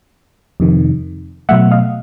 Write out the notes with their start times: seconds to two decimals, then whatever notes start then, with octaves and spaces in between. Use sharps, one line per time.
0.60 F2 C3 D#3
1.49 B2 F#3 A3 E5 F#5
1.72 D#5 F5